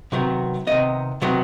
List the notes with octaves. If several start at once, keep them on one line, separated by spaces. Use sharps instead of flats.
C3 D#3 F#3 B3
C3 D#3 F#3 B3 D#5
C3 D#3 F#3 B3